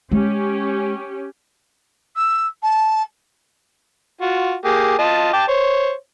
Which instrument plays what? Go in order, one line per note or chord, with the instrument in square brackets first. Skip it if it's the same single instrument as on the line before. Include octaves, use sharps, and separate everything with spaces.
[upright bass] G#3 [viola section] C#4 G4
[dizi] E6
A5
[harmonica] F4 F#4
A#3 G4 G#4
F4 D#5 A5
G5 A5 D6
C5 C#5